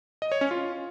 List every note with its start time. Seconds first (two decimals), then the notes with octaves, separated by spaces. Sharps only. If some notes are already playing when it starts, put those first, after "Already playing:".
0.22 D#5
0.32 C#5
0.41 C#4
0.51 F4